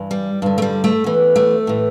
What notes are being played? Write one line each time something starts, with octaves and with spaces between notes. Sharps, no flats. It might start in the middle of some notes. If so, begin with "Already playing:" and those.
Already playing: G2 E3
G3
G2 D3
A3
G3
A3
E2 E3
A3
A2 E3